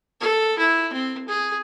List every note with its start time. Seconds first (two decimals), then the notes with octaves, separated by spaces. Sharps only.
0.21 A4
0.58 E4
0.92 C4
1.28 G#4